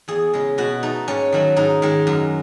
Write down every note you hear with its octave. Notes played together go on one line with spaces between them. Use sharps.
E2 G#4
C#3 G#3
B2 F#4
A3 D#4
G#2 C#4
D#3 F#3 A3
G#2 D#4
D#3 G#3
F#2